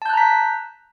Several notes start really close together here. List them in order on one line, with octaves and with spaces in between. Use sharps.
A5 G6 F#6 A#5 B6